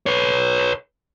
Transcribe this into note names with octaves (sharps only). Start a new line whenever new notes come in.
B4 C#5